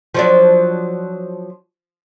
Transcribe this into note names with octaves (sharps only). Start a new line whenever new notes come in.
F3 F#3 D4